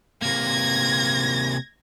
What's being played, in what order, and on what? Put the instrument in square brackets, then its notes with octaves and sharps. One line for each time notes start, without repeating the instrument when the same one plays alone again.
[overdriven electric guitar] C3 A#3 [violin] G#6 A#6